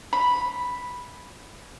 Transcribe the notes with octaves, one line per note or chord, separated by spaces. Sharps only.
B5